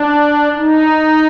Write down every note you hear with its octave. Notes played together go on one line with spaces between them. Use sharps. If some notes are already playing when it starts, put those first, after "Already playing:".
Already playing: D4
D#4